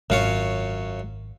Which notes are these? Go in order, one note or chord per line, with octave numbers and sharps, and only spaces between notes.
G#1 F#2 F4 C#5